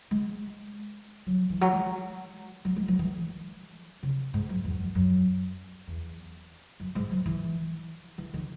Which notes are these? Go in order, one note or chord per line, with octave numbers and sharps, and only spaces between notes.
G#3
F#3
E3
F#3
G#3
F#3
G#3
F#3
E3
C#3
G#2
F#2
E2
F#2
F#2
E2
F#2
G#2
F#3
E3
E3
D#3